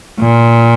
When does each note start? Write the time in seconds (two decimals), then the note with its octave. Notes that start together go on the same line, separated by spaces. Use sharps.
0.20 A#2